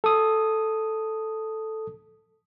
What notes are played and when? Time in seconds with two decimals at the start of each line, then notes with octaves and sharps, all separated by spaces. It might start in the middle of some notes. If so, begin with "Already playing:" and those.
0.04 A4 D#6